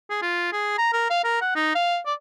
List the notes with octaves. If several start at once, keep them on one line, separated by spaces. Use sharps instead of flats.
G#4
F4
G#4
A#5
A#4
F5
A#4
F#5
D#4
F5
D5